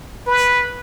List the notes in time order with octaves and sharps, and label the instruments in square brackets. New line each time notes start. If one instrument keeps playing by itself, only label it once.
[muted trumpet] B4